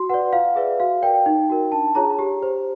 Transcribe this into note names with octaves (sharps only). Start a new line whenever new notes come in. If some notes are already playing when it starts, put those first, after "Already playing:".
Already playing: F#4 C6
B4 D5 F#5
F4 F5
G#4 B4 D5 E5
F#4 F5
A#4 D5 G5
D#4
F#4 A#4
D4 A5
F4 G#4 C#5 A#5
G4
C5